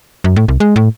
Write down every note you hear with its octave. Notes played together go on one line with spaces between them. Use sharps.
F#2
A2
C2
G#3
A2